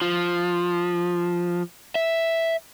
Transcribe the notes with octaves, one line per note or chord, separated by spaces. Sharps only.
F3
E5